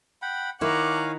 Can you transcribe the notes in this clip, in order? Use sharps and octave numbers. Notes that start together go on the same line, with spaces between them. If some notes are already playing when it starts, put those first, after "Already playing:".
F#5 G5 B5
D#3 E4 C#5 F5 F#5 G#5 A#5 D6